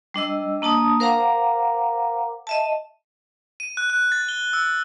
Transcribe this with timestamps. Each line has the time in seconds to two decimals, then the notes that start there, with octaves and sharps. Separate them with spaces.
0.14 G3 D4 D#5 E6
0.62 A#3 D4 A5 D#6
1.00 A#4 C5 F5 F#5 A#5 D6
2.47 D#5 E5 A5
3.60 D#7
3.77 F#6
3.90 F#6
4.12 A6
4.29 G7
4.53 E6